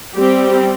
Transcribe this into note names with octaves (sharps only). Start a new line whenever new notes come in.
G3 C4 G4